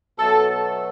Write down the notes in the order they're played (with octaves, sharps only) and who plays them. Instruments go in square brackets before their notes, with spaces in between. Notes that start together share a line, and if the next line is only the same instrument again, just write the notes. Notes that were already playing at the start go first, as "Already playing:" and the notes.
[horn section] B2 F#3 A3 A4